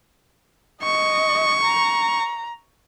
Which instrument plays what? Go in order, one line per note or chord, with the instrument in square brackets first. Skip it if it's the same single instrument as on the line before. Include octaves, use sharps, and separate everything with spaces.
[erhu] D#5 [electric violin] C#6
[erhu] A#5